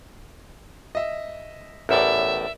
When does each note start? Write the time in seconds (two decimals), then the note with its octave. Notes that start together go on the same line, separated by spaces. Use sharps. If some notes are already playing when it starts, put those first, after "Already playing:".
0.95 D#5 E5
1.89 A1 E2 A2 A#4 D5 E5